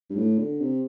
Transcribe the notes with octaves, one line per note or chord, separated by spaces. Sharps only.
G2
A2
D3
C3